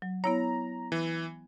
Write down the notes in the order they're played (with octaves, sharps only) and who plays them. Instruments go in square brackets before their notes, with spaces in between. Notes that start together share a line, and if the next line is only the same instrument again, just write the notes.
[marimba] F#3
[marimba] B3 E4 C#5 [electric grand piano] A#5
[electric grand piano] E3